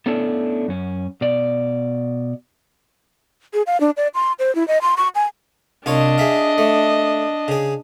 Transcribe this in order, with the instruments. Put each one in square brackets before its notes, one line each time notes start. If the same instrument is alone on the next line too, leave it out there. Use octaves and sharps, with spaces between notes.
[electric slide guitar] A3 B3 C#4 D4 E4 A4
F#2 C#4
B2 D5
[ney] G#4
F5
D4
D5
C6
C5
E4
D#5
C6
C#6
G#5
[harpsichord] C2 F4 C#5 [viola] D4 D#5
[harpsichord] G#4 E5 F5
A3
C#3 G#4